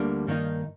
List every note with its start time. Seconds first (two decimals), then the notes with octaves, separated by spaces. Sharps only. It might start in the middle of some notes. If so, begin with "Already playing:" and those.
Already playing: D2 D3 G3 A#3
0.27 G2 D#3 A#3 D#4